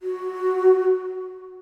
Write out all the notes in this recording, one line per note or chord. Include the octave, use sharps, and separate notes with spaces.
F#4